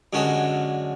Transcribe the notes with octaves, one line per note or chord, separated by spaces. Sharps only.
F#2 D3 G#3 C#4 F#4